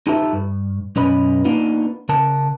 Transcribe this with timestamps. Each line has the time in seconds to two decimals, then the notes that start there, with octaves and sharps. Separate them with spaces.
0.07 D#4 F4 G4 A4 B4 E5
0.33 G2
0.96 B1 F#2 C#4 B4 D#5 B5
1.45 A#3 B3 D4 D#4 F4
2.09 C#3 A#4 A5